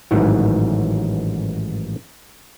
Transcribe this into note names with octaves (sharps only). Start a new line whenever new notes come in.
A1 G#2 D#3 E3 F#3